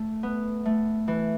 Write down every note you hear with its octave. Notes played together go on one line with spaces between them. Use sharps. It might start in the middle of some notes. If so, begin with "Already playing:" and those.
Already playing: A3
B3
A3
E3